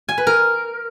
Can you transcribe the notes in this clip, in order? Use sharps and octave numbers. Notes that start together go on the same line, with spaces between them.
G#5
B4
A#4